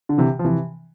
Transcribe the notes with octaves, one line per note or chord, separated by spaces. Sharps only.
D3
C3 E3
F3
C3 E3